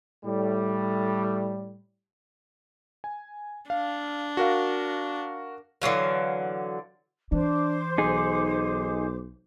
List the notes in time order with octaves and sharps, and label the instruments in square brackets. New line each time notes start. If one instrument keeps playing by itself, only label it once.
[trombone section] A2 G3
[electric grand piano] G#5
[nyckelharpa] D4 [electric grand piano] F5
[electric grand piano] F#4 A#4 F5
[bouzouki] D3 E3 F#3 F5
[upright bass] E3 [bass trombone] D4 [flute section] C5 D6
[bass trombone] B1 [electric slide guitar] D#4 G#4